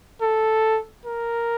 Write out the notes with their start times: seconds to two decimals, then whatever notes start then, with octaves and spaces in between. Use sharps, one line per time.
0.21 A4
1.06 A#4